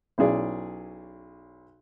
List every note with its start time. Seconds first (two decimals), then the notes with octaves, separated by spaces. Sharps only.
0.18 B1 C#4 E4 G#4 D5